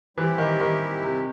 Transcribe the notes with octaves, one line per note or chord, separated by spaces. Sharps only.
E3 G3 C4 E4 G4
D#3
D#3
C3